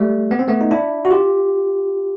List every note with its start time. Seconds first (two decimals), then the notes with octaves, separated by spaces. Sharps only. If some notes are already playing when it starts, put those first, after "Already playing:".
Already playing: G3 A3
0.31 B3
0.39 C4
0.48 A3 B3
0.61 D#4
0.71 D4 E4
1.05 F#4
1.11 F4 G4